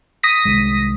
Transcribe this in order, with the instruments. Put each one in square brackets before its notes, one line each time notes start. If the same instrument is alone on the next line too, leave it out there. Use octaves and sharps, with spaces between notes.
[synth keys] D#6 A#6 B6
[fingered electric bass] C2 D#3 G#3